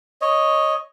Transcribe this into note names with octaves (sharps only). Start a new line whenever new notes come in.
C#5 D#5